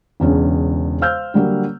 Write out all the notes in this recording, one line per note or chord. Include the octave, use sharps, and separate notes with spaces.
E1 E2 C#3 C#4 D4
C5 F5 E6 F6 G6
D3 F#3 G3 A#3